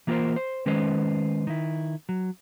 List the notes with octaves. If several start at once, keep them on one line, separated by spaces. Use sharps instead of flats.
E3 A#3 F4 G4 A#4 C5
C5
D#3 G#3 C#4 B4 C5
D#3 E4
F#3